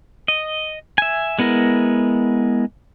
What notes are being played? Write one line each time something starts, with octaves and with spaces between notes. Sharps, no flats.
D#5
E5 G#5
G#3 B3 E4 A#4